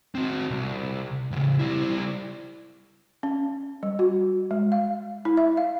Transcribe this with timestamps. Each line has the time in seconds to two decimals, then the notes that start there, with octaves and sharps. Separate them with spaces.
0.15 C4 F#4
0.50 C2
1.31 A2 C#3
1.59 G3 E4
3.23 C#4
3.83 G3
3.99 F#4
4.51 G#3
4.72 F5
5.25 E4
5.37 E5
5.57 F5